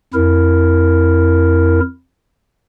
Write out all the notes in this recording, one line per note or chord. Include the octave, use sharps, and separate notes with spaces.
F2 E4 A#4